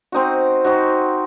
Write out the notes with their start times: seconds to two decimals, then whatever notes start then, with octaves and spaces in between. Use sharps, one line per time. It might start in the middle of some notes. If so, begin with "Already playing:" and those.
0.12 C4 D#4 F#4
0.64 C4 D#4 F#4